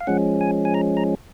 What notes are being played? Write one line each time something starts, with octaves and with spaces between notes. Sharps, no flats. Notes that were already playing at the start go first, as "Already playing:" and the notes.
F5
F3 G#3 C#4 F#5
G#5
G#5
A#5
A#5